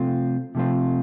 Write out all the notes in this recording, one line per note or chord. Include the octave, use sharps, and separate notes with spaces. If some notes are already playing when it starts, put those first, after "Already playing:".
Already playing: C3 F3 A3 C4 F4
C3 F3 A3 C4 F4